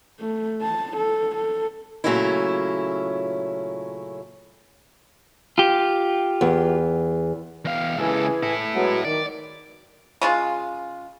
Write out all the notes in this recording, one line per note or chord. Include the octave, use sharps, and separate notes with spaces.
A3
A5
A4
A4
A#2 C#3 F#3 A3 C#4 E4
F4 G4
E2
E2 F5
C#2 E3 G#4 A4
E4 A4
F#3 G#3 B3
D#3 D5
C#3 G#3 F4